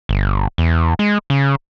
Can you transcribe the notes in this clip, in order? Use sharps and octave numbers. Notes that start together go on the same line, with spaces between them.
G1
E2
G#3
C#3